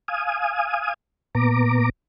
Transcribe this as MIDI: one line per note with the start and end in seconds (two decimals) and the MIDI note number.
0.08 0.94 77
0.08 0.94 80
0.08 0.94 87
1.35 1.89 46
1.35 1.89 59
1.35 1.89 82
1.35 1.89 86